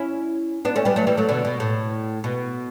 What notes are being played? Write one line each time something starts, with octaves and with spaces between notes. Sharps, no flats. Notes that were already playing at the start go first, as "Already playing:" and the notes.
Already playing: C#4 E4
B3 D4
A3 C#4
G3 B3
F#3 A3
E3 G3
F#3 A3
B2 D3
B2
A2
B2